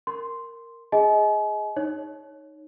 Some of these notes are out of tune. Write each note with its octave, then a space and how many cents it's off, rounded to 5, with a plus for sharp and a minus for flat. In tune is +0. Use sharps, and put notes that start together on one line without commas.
A#4 -10 C6 +0
G#4 +0 D#5 +25 G#5 +40
D#4 +0 C#5 +0